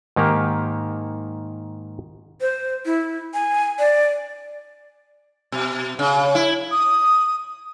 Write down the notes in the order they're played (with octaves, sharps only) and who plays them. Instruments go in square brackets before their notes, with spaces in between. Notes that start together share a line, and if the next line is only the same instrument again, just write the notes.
[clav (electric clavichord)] G#2 D#3 A#3 G4
[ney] C5
E4
G#5
D5
[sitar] B2
C#3
E4
[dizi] D#6